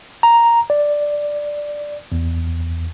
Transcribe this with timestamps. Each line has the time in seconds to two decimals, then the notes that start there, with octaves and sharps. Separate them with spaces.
0.23 A#5
0.70 D5
2.12 E2